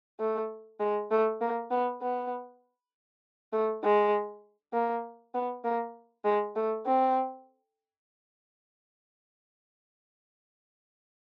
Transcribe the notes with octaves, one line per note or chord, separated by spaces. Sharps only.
A3
G#3
A3
A#3
B3
B3
A3
G#3
A#3
B3
A#3
G#3
A3
C4